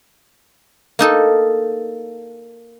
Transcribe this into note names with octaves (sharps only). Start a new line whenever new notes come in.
A#3 D#4 A4